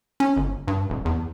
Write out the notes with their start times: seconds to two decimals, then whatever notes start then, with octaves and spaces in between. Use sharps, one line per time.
0.20 C#4
0.37 G1
0.68 G2
0.90 D#1
1.05 E2